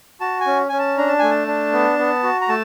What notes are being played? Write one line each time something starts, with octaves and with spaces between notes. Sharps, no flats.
F#4 A5
G#5
C#4
C#4 G#5
A5
D4 A#5
A5
A3 G#5
A5
D4
B3
B3
F#4
A#5
A3 A5